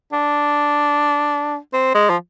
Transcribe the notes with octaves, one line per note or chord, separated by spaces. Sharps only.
D4
C4
G#3
F3